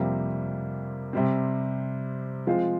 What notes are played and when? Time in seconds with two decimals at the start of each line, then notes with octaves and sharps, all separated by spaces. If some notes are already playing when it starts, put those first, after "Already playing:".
Already playing: F2 C3 G3 A#3 F4
1.13 C3 G3 C4
2.47 F3 G#3 C4 F4 C5